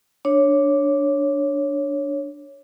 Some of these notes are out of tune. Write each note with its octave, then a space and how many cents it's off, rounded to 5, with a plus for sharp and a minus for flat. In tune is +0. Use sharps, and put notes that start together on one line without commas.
D4 +0 C#5 +0